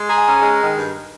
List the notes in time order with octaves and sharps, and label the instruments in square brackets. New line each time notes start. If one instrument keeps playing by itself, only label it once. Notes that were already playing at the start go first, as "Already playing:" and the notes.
Already playing: [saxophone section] G#3
[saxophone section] G#4 [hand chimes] A#5
[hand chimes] G#5
[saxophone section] C#4 [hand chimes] A#5
[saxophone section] G#3
D#3
G2